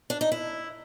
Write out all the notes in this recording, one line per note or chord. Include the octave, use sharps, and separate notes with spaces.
D4
D#4
E4